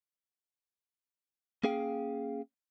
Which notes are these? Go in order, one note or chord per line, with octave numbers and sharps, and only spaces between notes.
A#3 C#4 G#4 F5 G5